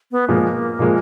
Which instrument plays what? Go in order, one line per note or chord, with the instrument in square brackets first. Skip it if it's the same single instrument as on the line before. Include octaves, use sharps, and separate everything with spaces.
[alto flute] B3
[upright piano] A#2 F3 G#3 [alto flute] A#3
[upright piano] A#2 F3 G#3